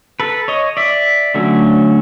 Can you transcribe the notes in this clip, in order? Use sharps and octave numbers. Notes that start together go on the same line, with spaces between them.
A4 B4
C#5 D#5
D5 E5
D3 F#3 A3 C#4